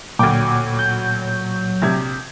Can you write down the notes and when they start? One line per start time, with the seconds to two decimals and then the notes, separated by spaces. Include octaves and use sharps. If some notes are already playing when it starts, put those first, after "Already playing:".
0.19 D2 A#2 F#3 G5 D6
0.79 G6
1.82 A#1 C3 G#6